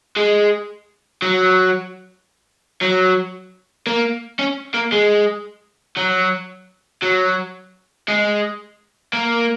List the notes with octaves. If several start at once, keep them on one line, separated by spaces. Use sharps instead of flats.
G#3
F#3
F#3
A#3
C#4
A#3
G#3
F#3
F#3
G#3
A#3